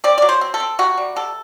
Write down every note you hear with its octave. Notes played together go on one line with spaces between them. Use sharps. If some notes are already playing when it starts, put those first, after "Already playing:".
C4 D5
F#3 D5
C5
C4
A4
C4
C3 F#4
G3
C3 A4